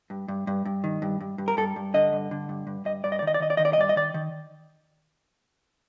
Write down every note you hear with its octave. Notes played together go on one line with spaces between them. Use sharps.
G2
G2
G2
G2
D#3
G2
G2
G2
A#4
G2 A4
G2
D3 D#5
G2
D3
G2
G2
G2 D#5
G2 D5
D#5
D5
D#3
D#5
D5
D#3 D#5
D5
D#3 D#5
D5
D#5
G2 D5
D#5
D#3 D5
D#3